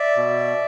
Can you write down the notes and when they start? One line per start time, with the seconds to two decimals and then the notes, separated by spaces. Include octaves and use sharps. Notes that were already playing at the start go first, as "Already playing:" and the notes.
Already playing: D5 E5
0.16 B2